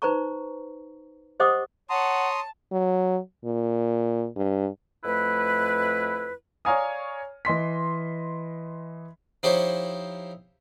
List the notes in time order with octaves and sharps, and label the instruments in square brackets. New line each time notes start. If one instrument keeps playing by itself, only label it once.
[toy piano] D#4 B4 C5 A#5 C#6
G4 C5 D#5 F#5 D6 D#6
[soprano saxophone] C#5 [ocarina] F#5 [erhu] A5 [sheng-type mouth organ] A#5 C6 D#6
[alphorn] F#3
A#2
G2
[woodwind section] F2 A3 E4 B4
[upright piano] C#5 D5 F5 G#5 A#5 D#6
E3 D#5 C6 B6
[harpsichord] F3 D#4 E4 G4 C5 C#5